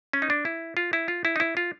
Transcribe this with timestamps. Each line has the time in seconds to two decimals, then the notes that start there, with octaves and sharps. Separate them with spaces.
0.13 C#4
0.22 D#4
0.30 D4
0.45 E4
0.77 F4
0.93 E4
1.08 F4
1.25 E4
1.36 D#4
1.40 E4
1.57 F4